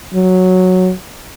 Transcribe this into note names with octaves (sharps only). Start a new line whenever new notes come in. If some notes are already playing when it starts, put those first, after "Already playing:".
F#3